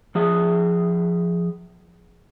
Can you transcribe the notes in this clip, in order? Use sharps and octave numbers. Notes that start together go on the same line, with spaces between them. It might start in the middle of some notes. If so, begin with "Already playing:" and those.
F3 G#4 E5